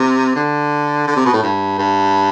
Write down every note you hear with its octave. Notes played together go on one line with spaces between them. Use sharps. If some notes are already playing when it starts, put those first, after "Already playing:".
Already playing: C3
D3
D3
C3
B2
A2
G2
G2